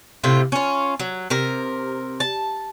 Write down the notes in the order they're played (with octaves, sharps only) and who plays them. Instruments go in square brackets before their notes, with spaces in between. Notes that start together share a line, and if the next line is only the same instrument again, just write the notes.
[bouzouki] A2 C3 F4
C#4 F4
F#3
C3 A#4
A5